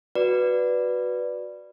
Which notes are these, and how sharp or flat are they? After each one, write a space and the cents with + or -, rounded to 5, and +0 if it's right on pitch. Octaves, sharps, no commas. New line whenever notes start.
F#4 -5 B4 +0 D5 +0